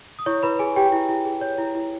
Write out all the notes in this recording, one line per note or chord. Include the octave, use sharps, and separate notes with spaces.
D#6
E4 C#5 C#6
E4 B4 B5
G#4 G#5
G4 C#5 G5
E4
E4
G#4
C#5
E4
E4